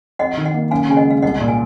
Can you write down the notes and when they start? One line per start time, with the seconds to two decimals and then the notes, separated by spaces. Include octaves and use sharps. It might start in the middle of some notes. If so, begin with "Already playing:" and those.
0.19 F2 D#5 F#5
0.37 D#3
0.45 D#5 F#5
0.54 A#3
0.71 F#2 F5 G#5
0.89 C#3 G#5
0.97 D#5 F#5
1.05 G#3
1.11 F5
1.22 C2 D#5 F#5
1.40 A#2
1.48 F5 G#5